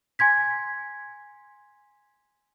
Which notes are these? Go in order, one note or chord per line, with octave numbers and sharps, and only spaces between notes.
G#5 C6 G#6 B6